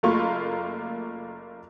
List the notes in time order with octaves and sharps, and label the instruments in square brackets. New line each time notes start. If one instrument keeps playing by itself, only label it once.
[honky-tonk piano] F#1 A3 A#3 F4 C#6